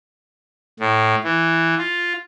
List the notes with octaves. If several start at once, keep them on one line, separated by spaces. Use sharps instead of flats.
A2
E3
F4